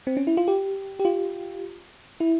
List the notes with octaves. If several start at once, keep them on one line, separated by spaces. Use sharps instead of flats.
C4
C#4
E4
F4
G4
G4
F4
E4